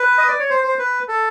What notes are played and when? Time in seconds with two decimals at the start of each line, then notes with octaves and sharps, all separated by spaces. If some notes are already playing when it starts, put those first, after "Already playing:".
Already playing: B4
0.18 D#5
0.28 D5
0.40 C#5
0.50 C5
0.64 C5
0.79 B4
1.08 A4